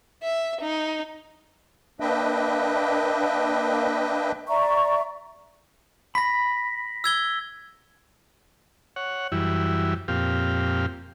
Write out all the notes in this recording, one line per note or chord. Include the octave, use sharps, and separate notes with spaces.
E5
D#4
A#3 D4 B4 D#5 E5 G5
D5 E5 A#5 C#6
B5 A#6 B6
E6 G#6 G7
C#5 F#5
F#2 E3 G3 E4
F2 A#2 C4 G4 F5